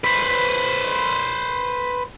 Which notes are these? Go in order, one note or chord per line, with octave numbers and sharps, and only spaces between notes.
B4 C5